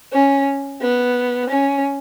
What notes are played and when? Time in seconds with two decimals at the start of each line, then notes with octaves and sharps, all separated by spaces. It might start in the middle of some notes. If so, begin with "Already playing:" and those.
0.13 C#4
0.81 B3
1.49 C#4